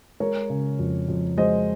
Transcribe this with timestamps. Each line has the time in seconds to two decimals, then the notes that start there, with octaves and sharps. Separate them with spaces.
0.20 G#3 A#4 C#5
0.50 C#3
0.79 F2
1.09 F2
1.37 G#3 C5 D#5